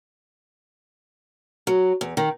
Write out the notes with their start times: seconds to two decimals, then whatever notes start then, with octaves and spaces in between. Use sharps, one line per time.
1.67 F#3
2.01 E2
2.17 D#3